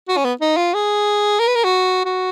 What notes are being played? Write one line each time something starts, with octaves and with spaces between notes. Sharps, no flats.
F#4
C#4
B3
D#4
F4
G#4
A#4
B4
A#4
F#4
F#4